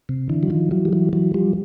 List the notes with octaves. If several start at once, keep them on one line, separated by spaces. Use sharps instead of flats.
C3
D3 E3
F#3
D#3 F3
E3 F#3
G3
E3 F#3
E3 F#3
F3 G3